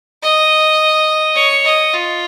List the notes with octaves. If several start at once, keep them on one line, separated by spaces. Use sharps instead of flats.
D#5
C#5
D#5
F4